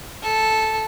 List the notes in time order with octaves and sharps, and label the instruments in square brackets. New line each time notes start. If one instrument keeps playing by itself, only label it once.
[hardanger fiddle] A4